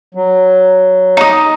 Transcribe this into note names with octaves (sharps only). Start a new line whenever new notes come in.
F#3
D#4 D#5